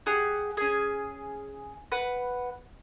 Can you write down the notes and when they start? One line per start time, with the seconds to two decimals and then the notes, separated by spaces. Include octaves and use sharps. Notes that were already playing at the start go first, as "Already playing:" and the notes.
0.06 G4 G#4 F#5
0.57 C#4 G#4
1.92 B4 F#5